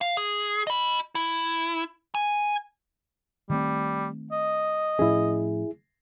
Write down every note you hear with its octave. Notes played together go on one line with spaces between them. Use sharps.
F5
G#4
D#5 B5
E4
G#5
D#3 G3 A3 C4
D#5
A2 F3 C#4 E4 G#4